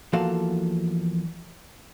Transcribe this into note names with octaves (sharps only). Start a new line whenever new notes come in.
E2 F3 A#3 F#4 A4 F5